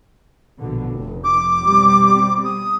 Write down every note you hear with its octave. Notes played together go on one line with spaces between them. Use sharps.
A#1 B2 D3
F1
D6
B2 G3 C4
D#6